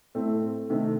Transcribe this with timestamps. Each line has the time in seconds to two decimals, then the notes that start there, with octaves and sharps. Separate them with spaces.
0.15 A2 A3 C4
0.70 C3 D#3 A3